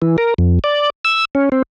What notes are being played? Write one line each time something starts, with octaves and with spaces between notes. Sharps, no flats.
E3
A#4
F2
D5
E6
C#4
C4